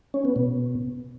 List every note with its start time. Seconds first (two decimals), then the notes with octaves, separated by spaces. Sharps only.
0.14 C#4
0.25 B3
0.36 B2